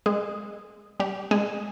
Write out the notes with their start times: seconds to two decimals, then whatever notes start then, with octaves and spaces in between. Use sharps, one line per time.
0.06 G#3 G#4
1.00 G3 G4
1.31 G#3 G#4